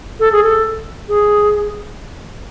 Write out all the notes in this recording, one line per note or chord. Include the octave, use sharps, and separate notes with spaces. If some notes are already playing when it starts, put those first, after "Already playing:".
A4
G#4
A4
G#4